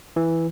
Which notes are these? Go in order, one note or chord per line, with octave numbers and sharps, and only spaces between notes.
E3